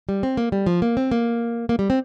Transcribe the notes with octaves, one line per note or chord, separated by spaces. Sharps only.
G3
C4
A#3
G3
F3
A#3
C4
A#3
A#3
G3
C4